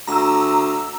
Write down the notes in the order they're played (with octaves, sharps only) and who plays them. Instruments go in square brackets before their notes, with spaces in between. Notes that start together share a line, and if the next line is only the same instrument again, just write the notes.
[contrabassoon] D2 [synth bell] A#5 E6